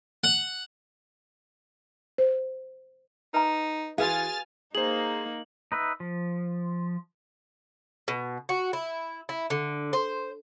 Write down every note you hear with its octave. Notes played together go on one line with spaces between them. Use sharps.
F#5
C5
D#4 B4 A#5
E3 F#4 G#4 B4 F5 G#5 F6 A6
A#3 D#4 G#4 C5 F#7
D#4 B4 E5
F3
B2
F#4
E4
E4
D3
C5